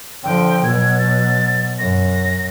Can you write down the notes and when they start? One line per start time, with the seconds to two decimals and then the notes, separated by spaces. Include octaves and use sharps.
0.24 D3 F3 G5
0.63 B2 F#3 G#6
0.98 A6
1.79 F#2 A#6